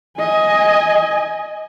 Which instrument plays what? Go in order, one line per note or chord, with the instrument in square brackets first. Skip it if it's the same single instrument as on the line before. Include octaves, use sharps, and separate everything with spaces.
[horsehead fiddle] D#5 G#5